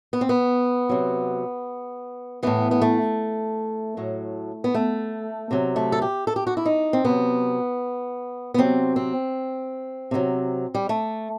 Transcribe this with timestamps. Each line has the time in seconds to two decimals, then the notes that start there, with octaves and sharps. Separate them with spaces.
0.13 B3
0.21 C4
0.29 B3
0.89 C3 F#3
2.43 A2 E3 B3
2.71 B3
2.82 A3
3.97 A2 F#3
4.64 B3
4.74 A3
5.51 C3 F#3
5.76 A3
5.92 A4
6.02 G4
6.27 A4
6.36 G4
6.47 F#4
6.57 E4
6.66 D#4
6.93 C4
7.04 C3 F#3 B3
8.54 B3
8.58 C3 F#3 C4
8.96 C4
10.11 C3 D#3 F#3
10.75 G3
10.89 A3